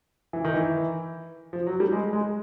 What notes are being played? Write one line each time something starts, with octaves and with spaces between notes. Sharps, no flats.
E3
D#3
E3
F3
F#3
G3
G#3
G#3